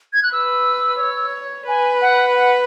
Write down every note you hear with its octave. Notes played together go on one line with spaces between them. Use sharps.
G#6
F#6
B4 E6
C#5
B4 G#5
F#5
F#5